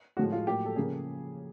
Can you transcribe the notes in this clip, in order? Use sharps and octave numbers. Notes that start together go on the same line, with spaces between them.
A2 F3 G#3 F#4
F4
A2 F#3 A#3 G4
A4
C#3 F3 A#3 G#4